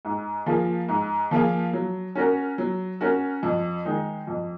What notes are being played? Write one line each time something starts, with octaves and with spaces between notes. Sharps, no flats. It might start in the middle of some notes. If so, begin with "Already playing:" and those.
G#2
F3 A#3 F4 G#4
G#2
F3 A#3 F4 G#4
F#3
C#4 F#4 A#4
F#3
C#4 F#4 A#4
F2
D#3 G#3 D#4
F2